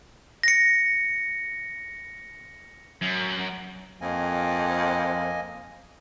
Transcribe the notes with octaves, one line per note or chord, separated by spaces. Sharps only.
A#6 C#7
F#2
F2 A#3 D#5 G#5